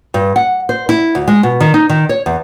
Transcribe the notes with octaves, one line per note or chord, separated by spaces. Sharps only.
G2
F#5
C5
E4
D2
G#3
B2
D#3
D#4
D#3
C#5
E2